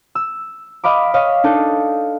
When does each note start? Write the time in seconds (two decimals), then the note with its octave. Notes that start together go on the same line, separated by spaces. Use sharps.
0.15 E6
0.84 D#5 F5 B5 D6
1.14 C#5 D#5 F5
1.44 D4 D#4 A4